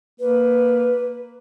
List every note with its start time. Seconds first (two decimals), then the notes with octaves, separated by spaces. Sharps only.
0.20 A#3 B4